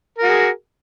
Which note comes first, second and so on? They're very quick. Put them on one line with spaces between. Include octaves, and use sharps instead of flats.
A#4 F#4 G#4